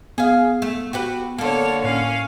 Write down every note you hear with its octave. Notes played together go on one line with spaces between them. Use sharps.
B3 G#4 F5
A3
F#4 G4 B4
D3 A#3 A4 C#5
A2 C#4 F5